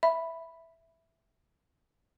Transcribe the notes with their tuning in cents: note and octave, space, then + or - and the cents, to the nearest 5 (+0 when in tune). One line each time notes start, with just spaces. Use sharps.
E5 +0 B5 +0